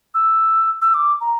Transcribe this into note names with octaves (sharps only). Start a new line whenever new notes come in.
E6
E6
D6
A#5